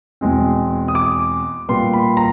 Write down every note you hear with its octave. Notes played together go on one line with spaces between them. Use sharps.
E2 B2 G#3 C4
D#6
D6
A#2 G3 B3 C6
B5
A#5